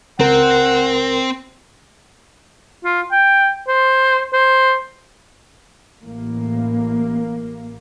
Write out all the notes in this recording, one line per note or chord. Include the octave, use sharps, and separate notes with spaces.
C#2 C4 A#4 F#5
F4
G5
C5
C5
A1 A#3